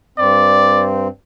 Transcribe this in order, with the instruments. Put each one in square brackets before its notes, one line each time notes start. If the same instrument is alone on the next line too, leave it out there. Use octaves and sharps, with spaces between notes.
[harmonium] G2 C4 [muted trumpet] D5